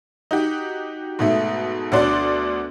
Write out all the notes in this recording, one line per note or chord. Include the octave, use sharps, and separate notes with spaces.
D#4 F#4 G4
G#2 B2 A3
D2 B2 D4 F#4 D5 C6